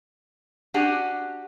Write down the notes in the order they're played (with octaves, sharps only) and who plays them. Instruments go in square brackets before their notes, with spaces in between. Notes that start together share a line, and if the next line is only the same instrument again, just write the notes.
[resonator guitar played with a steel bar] D4 F#4 G4 F#5 G#5